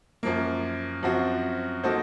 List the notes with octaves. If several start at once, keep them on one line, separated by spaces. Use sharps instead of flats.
F#2 F3 A#3
F#2 F3 C4 F#4
A#3 D#4 F#4 A4 C5